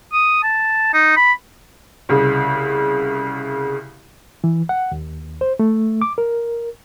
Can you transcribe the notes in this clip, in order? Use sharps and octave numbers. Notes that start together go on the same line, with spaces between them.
D#6
A5
D#4
B5
C2 C#3
E3
F#5
D#2
C5
A3
D6
A#4